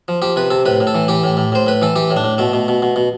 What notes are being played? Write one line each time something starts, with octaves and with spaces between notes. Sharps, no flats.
F3
F3 G4
C3 B4
C3 A4
A2 B4
A2
A4
E3
E3 G4
A2
A2
A2 C5
A2 B4
E3 A4
E3 G4
A2
D4
A2
B2 A3
B2
B2
B2
B2